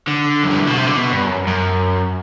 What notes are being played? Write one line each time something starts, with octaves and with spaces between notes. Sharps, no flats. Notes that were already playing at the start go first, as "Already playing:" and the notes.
D3
F#2
G2
A2
B2
C3
D3
B2
G2
F#2
F#2